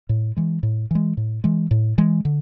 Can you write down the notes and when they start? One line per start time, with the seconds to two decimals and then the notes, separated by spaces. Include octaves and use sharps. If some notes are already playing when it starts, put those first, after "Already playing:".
0.09 A2
0.37 E3 G#3
0.63 A2
0.91 E3 G#3
1.17 A2
1.44 E3 G#3
1.71 A2
1.98 E3 G#3
2.25 D3